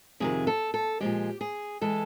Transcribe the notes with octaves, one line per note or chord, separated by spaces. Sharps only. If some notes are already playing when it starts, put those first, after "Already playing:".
F2 C3 D#3 G#4
A4
A4
A#2 F3 G#3 G4
G#4
E3 G#3 A4